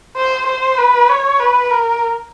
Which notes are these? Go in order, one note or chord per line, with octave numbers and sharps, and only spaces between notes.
C5
C5
B4
C#5
B4
A#4